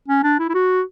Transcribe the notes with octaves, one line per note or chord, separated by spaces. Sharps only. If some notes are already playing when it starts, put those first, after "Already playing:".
C#4
D4
E4
E4
F#4